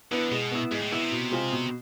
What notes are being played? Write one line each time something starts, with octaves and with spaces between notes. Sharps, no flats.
D3 B3 E4 B4
B2 G#3
B3 E4
G#2 G#3
A2
B2 B3 E4
C3
B2
G#3 C4 F4 G#4
B2